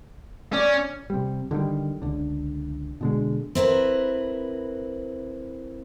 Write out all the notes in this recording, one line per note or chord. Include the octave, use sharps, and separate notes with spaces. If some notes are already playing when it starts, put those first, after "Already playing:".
C#4 D5
C3 G3
D3 D#3 F#3 G3
C#2 D3
B2 D3 G#3
C4 E4 A#4 B4